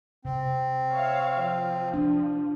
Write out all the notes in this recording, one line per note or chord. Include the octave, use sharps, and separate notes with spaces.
C3 C4
C#5 E5 F5
F3
D4